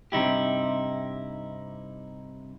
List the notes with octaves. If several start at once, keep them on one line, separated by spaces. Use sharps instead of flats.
G2 C3 E3 D#4 E4 G4